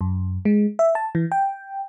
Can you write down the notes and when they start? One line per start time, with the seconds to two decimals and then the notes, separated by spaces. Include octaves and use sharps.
0.01 F#2
0.45 G#3
0.79 E5
0.95 A5
1.15 E3
1.32 G5